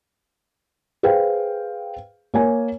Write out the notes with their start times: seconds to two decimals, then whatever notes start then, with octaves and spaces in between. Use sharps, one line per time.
1.03 G#4 B4 C5 F5 G5
2.34 A#3 C#5 G#5